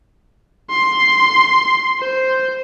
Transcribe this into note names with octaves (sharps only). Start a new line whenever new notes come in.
C6
C5